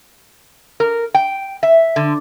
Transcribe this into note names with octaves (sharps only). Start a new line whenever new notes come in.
A#4
G5
E5
D3